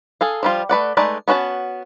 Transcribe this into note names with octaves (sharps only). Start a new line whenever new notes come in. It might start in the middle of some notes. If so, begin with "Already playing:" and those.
G#4 A4 F5
F3 G3 F4
A3 B4 D5 F#5
G#3 A3 D#4 B4 D5
B3 C#4 F#4 G5 A5